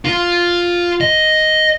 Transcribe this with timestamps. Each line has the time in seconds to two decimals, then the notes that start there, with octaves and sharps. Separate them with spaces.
0.05 F4
1.01 D#5